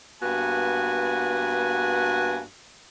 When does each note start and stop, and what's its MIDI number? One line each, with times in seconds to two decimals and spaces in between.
0.22 2.41 43
0.22 2.41 58
0.22 2.41 59
0.22 2.41 66
0.22 2.41 80